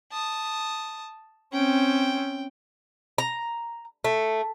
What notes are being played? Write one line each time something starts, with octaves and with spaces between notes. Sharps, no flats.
A5 D#6
C4 C#4 G5
A#5
A3